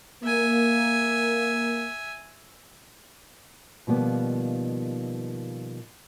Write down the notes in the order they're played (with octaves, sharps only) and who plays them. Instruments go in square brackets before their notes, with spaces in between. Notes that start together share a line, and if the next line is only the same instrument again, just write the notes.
[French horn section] A#3 [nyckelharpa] E5 G#5
[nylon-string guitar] B2 D#3 F3 G3 A#3 B3